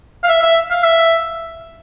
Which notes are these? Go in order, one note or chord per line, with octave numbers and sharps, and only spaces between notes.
F5
E5
E5
F5
E5